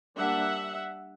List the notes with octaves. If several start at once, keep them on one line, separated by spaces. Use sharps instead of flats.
G3 A#3 D4 E5 F#5